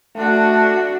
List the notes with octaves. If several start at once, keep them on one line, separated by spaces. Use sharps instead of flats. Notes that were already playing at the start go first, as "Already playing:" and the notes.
A3 D4 F#4